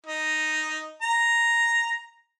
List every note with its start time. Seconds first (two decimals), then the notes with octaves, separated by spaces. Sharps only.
0.06 D#4
1.02 A#5